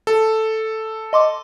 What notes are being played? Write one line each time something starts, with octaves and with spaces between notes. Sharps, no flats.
A4
D#5 C6 D6